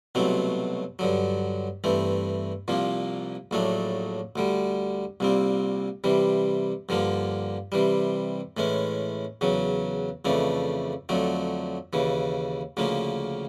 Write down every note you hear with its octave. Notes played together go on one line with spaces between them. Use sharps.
C2 B2 F#3 A3 C4
G2 D3 F#3
G2 E3 A3 C4
C2 A#2 F3 A#3
A#1 A2 F#3 A3 D4
D2 D3 G3
C2 A#2 G3 C4
C3 E3 G3
G2 D3 F3 A#3
C3 E3 G3
A2 E3 G#3 C#4
E2 C#3 F#3
F2 C#3 E3 A3 D4
F2 D3 F#3 A3
D#2 C#3 E3
D2 C#3 F3 A#3